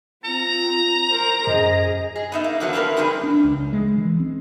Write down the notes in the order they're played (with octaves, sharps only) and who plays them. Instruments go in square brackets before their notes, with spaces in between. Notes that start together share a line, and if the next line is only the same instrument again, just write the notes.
[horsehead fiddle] C4 F4 [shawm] A#5
[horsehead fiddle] A#4 C5
[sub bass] F#2 [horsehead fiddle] G#4 [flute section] D#5
[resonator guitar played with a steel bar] G#4
B3 D#4 E5
A#3
B2 D3 F3 F#3 B3 A4
A#3 C4 E4 G4 A#4 B4
D3 G3 C4 D#4 F4 G#4
[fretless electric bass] D4
C#2
G#3
E3
C4